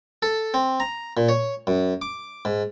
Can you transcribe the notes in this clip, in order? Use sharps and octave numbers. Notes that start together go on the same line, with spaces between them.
A4
C4
A#5
A#2
C#5
F#2
D6
G#2